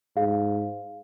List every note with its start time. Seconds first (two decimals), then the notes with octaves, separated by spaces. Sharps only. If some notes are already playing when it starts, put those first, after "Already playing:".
0.17 G#2 G#4 F5